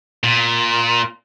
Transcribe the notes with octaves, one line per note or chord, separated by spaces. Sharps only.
A#2